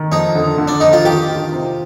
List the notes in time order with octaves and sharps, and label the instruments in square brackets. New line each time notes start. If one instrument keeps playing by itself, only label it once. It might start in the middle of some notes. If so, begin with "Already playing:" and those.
Already playing: [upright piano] D#3
[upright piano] F2 [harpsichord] D#4
[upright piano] D3
D3
[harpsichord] D4
[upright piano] F2 [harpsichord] D#4
[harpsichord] F4
[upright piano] D#3 [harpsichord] G4
[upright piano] F4
C3